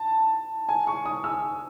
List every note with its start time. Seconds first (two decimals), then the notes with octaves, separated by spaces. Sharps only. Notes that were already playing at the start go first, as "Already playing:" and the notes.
Already playing: A5
0.69 G#5
0.87 C#6
1.05 D#6
1.24 E6